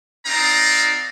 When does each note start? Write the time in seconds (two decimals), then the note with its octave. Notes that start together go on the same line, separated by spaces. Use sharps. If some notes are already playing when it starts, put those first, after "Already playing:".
0.26 C4 D#4 F#4 D5 F5 A#5